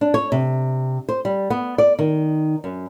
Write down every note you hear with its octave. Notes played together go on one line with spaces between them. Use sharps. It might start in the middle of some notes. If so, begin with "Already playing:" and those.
D4
C#5
C3
C5
G3
B3
D5
D#3
F#2